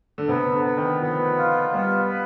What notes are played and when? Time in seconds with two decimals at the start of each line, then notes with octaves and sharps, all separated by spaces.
0.18 D3
0.28 C3 B3
0.53 D3
0.65 B3
0.77 D#3
1.01 F3 B3
1.37 F4
1.73 G3 B3
2.10 B4